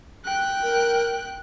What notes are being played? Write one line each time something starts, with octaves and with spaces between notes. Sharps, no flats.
G5 F#6
A#4